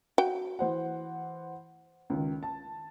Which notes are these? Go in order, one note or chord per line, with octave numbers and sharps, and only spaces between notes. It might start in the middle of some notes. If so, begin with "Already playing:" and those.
F#4 G5
E3 C5 F#5
C#2 D#3
A5